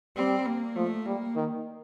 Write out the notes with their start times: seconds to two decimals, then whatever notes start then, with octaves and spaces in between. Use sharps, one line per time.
0.17 G3 C4
0.46 A#3
0.76 F3 A3
1.06 G3 A#3
1.36 D#3